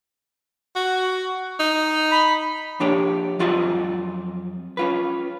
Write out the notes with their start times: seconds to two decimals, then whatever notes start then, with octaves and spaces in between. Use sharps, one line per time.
0.76 F#4
1.60 D#4
2.12 B5
2.80 F3 A#3 D4 G4 C#5 D5
3.39 F2 F#3 F4 F#4 D5 D#5
4.77 C#4 F4 B4